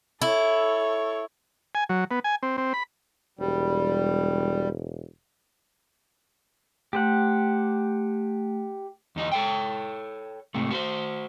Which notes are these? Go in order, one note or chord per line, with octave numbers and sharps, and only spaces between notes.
E4 A4 C#5
G#5
F#3
B3
G#5
C4
C4
B5
E1 G3
A3 G4 C5 F#5
E2 D#4 D#5
A4 C#5 G5
G#2 C3 A3
F#4 B4 C5